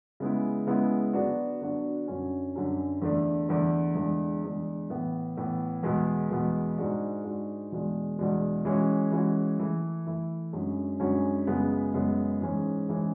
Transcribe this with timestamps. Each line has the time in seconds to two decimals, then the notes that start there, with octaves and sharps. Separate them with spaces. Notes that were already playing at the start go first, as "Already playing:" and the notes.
0.20 C#3 G#3 B3 E4
0.67 C#3 G#3 B3 E4
1.13 D3 F#3 B3 D4 F#4
1.61 D3 F#3 B3 D4 F#4
2.08 F#2 D3 F#3 C#4
2.55 F#2 D3 F#3 C#4
3.02 E2 D3 A3 D4
3.49 E2 D3 A3 D4
3.95 E2 D3 G#3 D4
4.43 E2 D3 G#3 D4
4.90 A2 E3 B3
5.37 A2 E3 B3
5.83 E2 B2 G#3 B3
6.31 E2 B2 G#3 B3
6.78 G#2 G#3 D4 F#4
7.25 G#2 G#3 D4 F#4
7.72 E2 B2 G#3 D4
8.19 E2 B2 G#3 D4
8.65 E3 G#3 C#4 F#4
9.12 E3 G#3 C#4 F#4
9.59 E3 A3 E4
10.06 E3 A3 E4
10.53 F#2 D3 G#3 C#4 F#4
11.00 F#2 D3 G#3 C#4 F#4
11.47 F#2 C#3 G#3 B3
11.94 F#2 C#3 G#3 B3
12.41 G#2 E3 G#3 C#4
12.88 G#2 E3 G#3 C#4